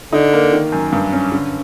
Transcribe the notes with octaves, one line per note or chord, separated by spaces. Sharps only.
D3 D#4
A#3
D#3
F#2
G2
C#4
D3